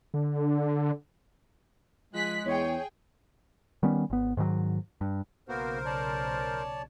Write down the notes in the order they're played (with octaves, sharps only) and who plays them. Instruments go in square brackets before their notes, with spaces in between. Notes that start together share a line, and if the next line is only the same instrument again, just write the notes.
[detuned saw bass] D3
[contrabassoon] F3 [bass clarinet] G#3 [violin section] G#4 F#6 B6
[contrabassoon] E2 [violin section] G#4 G5 [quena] C#5
[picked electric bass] D#3 G3 B3 C#4
G#1 B3
G#2 D#3 E3 F#3
G2
[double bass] B1 C#3 [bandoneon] A#3 B3 F#4 [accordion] A#4 C5
[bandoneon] C#5 D5 A5